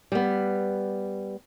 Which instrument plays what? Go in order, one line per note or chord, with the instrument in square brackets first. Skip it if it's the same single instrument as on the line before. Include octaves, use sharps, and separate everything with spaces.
[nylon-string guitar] G3 B3